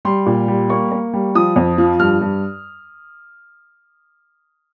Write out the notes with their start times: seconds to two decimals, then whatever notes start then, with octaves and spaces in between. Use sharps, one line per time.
0.05 G3 C6
0.26 A#2
0.48 G3
0.70 A#3 C#6
0.91 A#3
1.13 G3
1.35 F3 D#6
1.56 F2
1.78 F3
1.99 G2 F6
2.21 G2